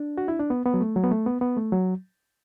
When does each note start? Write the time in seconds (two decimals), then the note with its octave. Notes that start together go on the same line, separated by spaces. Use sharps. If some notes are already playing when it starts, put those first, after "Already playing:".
Already playing: D4
0.18 F#4
0.28 E4
0.39 D4
0.50 B3
0.66 B3
0.74 F#3
0.81 A3
0.96 F#3
1.04 B3
1.11 A3
1.26 B3
1.41 B3
1.57 A3
1.72 F#3